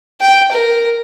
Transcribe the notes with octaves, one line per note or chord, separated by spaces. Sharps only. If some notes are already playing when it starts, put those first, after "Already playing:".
G5
A#4